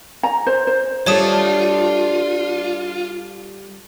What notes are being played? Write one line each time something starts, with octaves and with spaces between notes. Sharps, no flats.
A#5
C5
C5
G3 A3 D4 F4 A4 C#5 A5 D#6